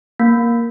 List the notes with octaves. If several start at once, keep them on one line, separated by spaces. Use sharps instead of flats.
A#3